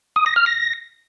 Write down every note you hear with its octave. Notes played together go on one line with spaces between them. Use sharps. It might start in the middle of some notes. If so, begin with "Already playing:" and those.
D#6
A#6
F6
A#6